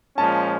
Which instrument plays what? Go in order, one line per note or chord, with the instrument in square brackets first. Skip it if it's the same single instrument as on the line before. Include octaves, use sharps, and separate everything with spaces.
[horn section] A#2 F3 G#3 C#4 [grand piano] A5